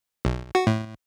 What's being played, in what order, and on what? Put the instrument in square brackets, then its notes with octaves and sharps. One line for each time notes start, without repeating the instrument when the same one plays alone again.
[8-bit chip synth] B1
F#4
A2